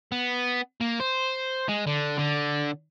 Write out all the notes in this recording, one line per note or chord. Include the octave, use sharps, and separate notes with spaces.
B3
A#3
C5
G#3
D3
D3